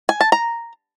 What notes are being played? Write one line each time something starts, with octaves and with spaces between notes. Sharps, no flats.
G#5
A5
A#5